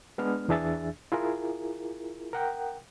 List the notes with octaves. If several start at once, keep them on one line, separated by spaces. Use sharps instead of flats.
G#3 B3 D4 F6
E2 E3 D4 G#4 E5 A6
E4 F4 G#4 A#4
A#4 F#5 G5